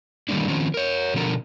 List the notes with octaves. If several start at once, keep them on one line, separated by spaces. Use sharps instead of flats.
D#3 E3 G3 A3 A#3 D4
D#3 F3 C4 C#4
A#4 C#5
B2 D3 F3 D4 A#4